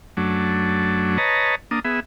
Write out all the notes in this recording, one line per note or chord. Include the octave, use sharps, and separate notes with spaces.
F#2 F#3 A3 D4
B4 C#5 D#5 A5 A#5
A#3 D4 D#6
B3 G#4 E5